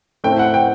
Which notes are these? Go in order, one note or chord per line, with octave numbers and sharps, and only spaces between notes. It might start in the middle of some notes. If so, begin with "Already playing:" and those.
A2 A3 C4 G5
F#5
G5